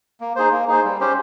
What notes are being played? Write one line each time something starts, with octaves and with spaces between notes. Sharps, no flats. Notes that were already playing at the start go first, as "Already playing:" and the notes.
A#3
D#4 G#4 C5
A#3
D#4 G#4 C5
G3
C#4 G4 C5